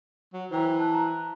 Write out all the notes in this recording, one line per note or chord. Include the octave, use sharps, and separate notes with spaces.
F#3
E3 C5 G5 A#5
A5 F#6
A#5